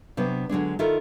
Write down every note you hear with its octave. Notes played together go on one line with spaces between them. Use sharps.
C3 F#3 B3 D4
D3 F#3 G#3 D4
D#3 E4 F4 A4 A#4